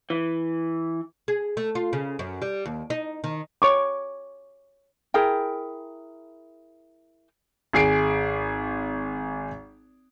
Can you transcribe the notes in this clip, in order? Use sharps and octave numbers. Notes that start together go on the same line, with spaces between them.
E3
G#4
A3
F4
C#3
F#2
G3
D#2
D#4
D#3
C#5 C#6 D6
E4 G#4 A#4 G5
G#1 G#4 C7 D7